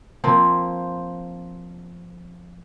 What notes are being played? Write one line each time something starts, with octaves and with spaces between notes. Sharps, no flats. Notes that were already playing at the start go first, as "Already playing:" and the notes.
F3 A#3 C4